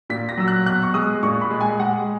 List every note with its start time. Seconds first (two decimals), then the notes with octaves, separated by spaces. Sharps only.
0.10 A#2 B6
0.29 A#6
0.38 F#3 E6
0.48 F#6
0.66 B2 F#6
0.83 C#6
0.94 G#3 D#6
1.23 A#2 C#6
1.41 B5
1.50 G#3
1.61 G#5
1.80 G#3 F#5